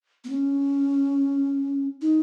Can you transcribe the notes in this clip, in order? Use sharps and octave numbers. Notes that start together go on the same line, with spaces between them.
B3
C#4
D#4